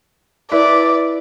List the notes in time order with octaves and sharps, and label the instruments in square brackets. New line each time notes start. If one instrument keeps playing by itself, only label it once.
[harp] E4 B4 [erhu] D5